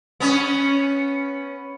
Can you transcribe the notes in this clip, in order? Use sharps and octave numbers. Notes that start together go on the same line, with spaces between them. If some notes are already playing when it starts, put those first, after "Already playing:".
B3 C#4